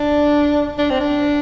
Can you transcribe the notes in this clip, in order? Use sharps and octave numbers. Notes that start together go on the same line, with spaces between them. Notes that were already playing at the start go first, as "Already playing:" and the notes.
Already playing: D4
D4
C4
D4